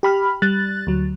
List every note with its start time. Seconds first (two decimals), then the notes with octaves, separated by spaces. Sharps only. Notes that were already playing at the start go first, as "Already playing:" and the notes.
0.03 G4 B5 F6
0.42 G3 F#6 A6
0.87 D2 F#3